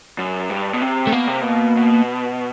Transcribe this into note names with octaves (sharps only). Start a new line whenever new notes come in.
F#2
G2
B2
C3
A3
B2 A#3
C3
B2
B2